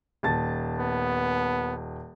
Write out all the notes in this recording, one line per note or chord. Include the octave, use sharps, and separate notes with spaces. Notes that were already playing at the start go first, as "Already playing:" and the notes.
D#1 A5 A6
B3